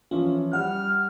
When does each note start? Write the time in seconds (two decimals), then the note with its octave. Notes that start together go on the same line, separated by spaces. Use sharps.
0.11 E3 F3 C#4 F4
0.53 G3 F#5 F6